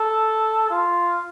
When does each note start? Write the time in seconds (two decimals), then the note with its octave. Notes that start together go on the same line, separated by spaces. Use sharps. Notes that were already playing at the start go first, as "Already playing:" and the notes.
Already playing: A4
0.70 F4